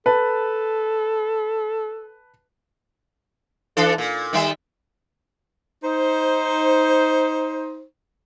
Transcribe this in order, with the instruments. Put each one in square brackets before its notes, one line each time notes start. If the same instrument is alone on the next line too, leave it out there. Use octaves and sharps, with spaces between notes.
[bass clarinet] A4 [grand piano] B4 A5
[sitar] E3 D4 A4
A#2
D#3 G3 E5
[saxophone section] D#4 C5